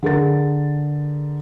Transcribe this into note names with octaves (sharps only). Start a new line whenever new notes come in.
D3 G#4 A#4 A6